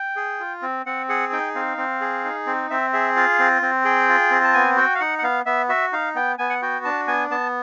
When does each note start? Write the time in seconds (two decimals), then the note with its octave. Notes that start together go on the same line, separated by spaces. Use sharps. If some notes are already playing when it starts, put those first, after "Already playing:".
Already playing: G5
0.16 G#4
0.40 F4
0.62 C4
0.86 C4 F#5
1.09 G#4 F#5
1.33 D#4 G5
1.55 C4 F5
1.77 C4
2.01 G#4
2.24 D#4
2.47 C4
2.70 C4 E5
2.93 G#4 E5
3.16 F4 F5
3.39 C4
3.62 C4
3.85 G#4 G5
4.09 F4
4.31 C4
4.44 A5
4.54 B3 G#5
4.77 F#4 G5
4.95 F5
5.00 D#4 F#5
5.18 F#5
5.23 B3 F5
5.46 B3 E5
5.69 F#4 E5
5.92 D#4 F5
6.15 B3 G5
6.38 B3 G#5
6.50 F#5
6.62 F#4 G5
6.85 D4 A5
7.07 B3 G#5
7.30 B3 A5